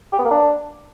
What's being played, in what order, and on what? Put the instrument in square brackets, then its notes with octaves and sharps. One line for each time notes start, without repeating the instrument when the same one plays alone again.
[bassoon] G4
B3
A#3
D4